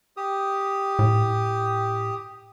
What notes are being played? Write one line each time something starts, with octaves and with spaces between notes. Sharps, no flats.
G4 D#6
A2